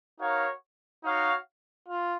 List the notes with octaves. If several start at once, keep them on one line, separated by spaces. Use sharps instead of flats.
D#4 F#4 A#4 C#5 F5
D#4 F#4 C#5 F5
F4